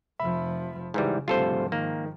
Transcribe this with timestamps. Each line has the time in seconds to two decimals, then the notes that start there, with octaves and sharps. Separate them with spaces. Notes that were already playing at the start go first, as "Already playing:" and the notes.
0.19 F1 F3 E5 B5
0.94 G#2 C#3 E3 G3
1.28 D2 G#2 C3 F3 G3 F4 A4 C5
1.72 D#3 A#3